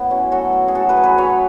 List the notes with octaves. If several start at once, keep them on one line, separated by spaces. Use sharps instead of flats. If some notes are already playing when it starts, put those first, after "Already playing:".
Already playing: A2 B3
F#3 C#4
F#3 F#4 A4
A2
G#4
F#3 F#4 A4
G#4 B4
F#3
G#4 B4
F#3 A4 C#5